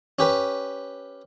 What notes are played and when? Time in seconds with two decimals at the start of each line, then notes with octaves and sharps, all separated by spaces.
0.19 C#4 G4 B4